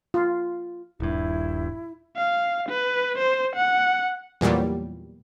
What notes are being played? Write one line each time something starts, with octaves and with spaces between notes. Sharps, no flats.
F4
D#1 G2 E4
F5
B4
C5
F#5
E2 A#2 F#3 G3